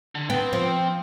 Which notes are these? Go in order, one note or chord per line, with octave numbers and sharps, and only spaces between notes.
D3
B3 C4 G5
F3